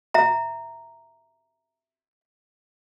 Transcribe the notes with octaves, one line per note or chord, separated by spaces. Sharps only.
E5 A#5